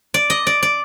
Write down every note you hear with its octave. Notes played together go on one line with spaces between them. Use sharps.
D5
D#5
D5
D5